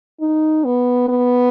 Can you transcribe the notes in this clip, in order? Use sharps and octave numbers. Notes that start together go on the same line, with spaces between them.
D#4
B3
B3